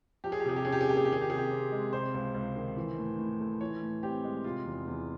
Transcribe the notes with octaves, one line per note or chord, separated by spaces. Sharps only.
F3 G4
G#4
G4
C3 G#4
G4
C#4 G#4
G4
G#4
A#3 G4
G#4
G4
D#3 G#4
G4
C3 G#4
G4
C4
G#3
C3 C5
C#2
C#2
D#3
E3
A2
A2
A3
E3 C#5
A2
C4 G4
G#3
C3 F4
E2
E2